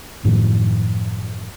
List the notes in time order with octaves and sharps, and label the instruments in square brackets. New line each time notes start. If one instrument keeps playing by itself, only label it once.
[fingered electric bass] F#2 A2 D#3 F3